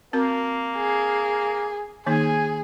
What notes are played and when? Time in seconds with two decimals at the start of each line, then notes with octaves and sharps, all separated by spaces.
0.13 A#3 C4 F#4 A#4
0.76 G#4
2.07 D#3 A#3 D#4 G#4 G#5